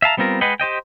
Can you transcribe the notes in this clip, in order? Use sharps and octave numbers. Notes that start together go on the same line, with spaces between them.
E5 F5 A5 A#5
G3 B3 C4 F4 A#4
G#3 B4 D#5 F#5 G5
G4 C5 D#5 G5